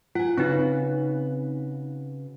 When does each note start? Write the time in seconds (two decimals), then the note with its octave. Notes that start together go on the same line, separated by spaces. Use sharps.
0.15 F4 F#5 G#5
0.37 C#3 C4 D#4 F#4 B4